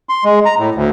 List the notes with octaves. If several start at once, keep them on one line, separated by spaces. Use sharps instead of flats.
C6
G#3
A#5
A2
D2